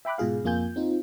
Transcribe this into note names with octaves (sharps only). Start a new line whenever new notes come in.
E5 G5 B5 D6 F#6
G#2 B2 F4 G#4 F5
F2 A#3 F4 G#5 G6
C4 D#4 F4